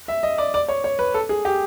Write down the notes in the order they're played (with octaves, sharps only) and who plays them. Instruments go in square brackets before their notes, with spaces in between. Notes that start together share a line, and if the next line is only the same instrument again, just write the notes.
[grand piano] E5
D#5
D5
D5
C#5
C#5
B4
A4
G#4
G4